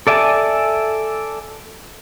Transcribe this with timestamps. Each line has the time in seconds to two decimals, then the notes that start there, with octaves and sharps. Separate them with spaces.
0.07 A4 D5 E5 G#5 A5